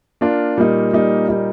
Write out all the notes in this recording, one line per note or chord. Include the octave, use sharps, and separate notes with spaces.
A#3 D4 F4
A#2 G3 A#3 D#4
A#2 G3 A#3 D#4
A#2 G3 A#3 D#4